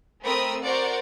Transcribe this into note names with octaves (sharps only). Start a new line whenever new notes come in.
A3 C4 A#4 B5 D#6 E6
F#4 A#4 C5 D5 F#5